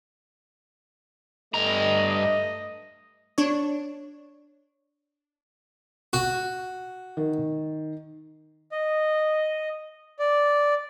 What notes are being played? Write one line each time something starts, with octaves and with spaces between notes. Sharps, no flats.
G2 A3 D#5 A#5
D4 C#5
F#4
D#3
D#5
D5